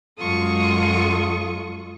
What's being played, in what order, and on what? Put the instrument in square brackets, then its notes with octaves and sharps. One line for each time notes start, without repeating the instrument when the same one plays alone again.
[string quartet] F#2 G#3 F4 A4 C#6 D#6